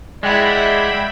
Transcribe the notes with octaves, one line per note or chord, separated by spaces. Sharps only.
G#3 E4 D5 E5 F#5 G5 B5